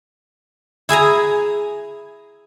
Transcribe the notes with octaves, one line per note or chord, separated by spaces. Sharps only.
E4 G#4 G#5 A#5